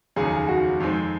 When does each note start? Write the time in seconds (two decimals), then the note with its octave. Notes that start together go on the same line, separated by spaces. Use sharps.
0.16 F1 D#2 C#3 F#3 G#4
0.48 F#4
0.80 F2 D#3 G#3 C4